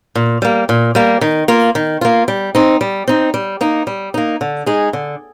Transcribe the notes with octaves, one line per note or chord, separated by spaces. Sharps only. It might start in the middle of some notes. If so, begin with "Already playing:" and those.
A#2
G3 A#3
A#2
G3 A#3
D#3
A#3 F4
D#3
A#3 F4
G3
C4 D#4
G3
C4 D#4
G3
A#3 D#4
G3
A#3 D#4
D3
G#3 D#4 G#4
D3